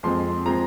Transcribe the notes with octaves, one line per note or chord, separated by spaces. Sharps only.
F2 F3 G#3 C4 C6
F3 G#3 C4 A#5